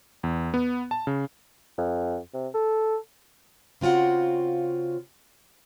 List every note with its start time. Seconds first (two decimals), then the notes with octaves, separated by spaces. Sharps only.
0.23 E2
0.54 B3
0.91 A5
1.07 C#3
1.78 F2
2.34 C3
2.54 A4
3.81 C#3 C4 F4 F#4 F#5